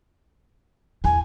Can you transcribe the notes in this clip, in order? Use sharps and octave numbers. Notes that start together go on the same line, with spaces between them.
E2 E4 G#5